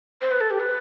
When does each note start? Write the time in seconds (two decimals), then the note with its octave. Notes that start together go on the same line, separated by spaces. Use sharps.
0.21 C5
0.31 B4
0.41 A4
0.51 G4
0.60 B4